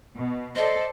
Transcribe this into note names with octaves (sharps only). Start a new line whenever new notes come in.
B2
A4 C5 D5 D#5